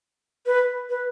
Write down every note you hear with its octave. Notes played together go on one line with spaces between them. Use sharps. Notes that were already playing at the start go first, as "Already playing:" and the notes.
B4
B4